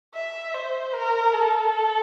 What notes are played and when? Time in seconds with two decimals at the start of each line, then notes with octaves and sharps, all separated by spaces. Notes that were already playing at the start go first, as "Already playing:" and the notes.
0.14 E5
0.54 C5
0.94 A#4
1.33 A4